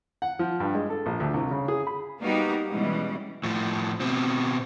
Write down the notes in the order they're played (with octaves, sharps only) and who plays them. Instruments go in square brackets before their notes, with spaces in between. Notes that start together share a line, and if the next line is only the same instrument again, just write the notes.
[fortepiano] F#5
F3
G2
G#3
A4
A#1
D2
C2
C#3
G#4
B5
[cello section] G3 A#3 B3 D#4 F#4 G4
B2 E3 G3 G#3 C#4
[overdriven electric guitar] A2 F3
B2 C4